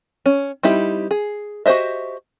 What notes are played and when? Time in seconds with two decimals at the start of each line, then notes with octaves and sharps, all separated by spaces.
0.26 C#4
0.63 G3 C4 D#4 E4 G4
1.11 G#4
1.66 F#4 G4 C5 D#5 E5